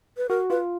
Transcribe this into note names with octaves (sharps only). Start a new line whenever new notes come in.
B4
F#4 A#4
F4 B4